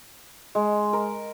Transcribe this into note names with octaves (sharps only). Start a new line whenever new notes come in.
G#3
A#4